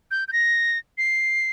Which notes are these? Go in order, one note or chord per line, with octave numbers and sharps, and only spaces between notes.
G6
G6
A#6
C7